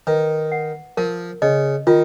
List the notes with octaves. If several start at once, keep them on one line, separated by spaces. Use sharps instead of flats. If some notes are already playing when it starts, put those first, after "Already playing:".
D#3 B4
F#5
F3 A#4
C#3 D#5
D#3 F4